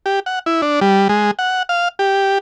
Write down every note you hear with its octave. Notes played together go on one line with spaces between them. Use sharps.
G4
F#5
E4
D4
G3
G#3
F#5
F5
G4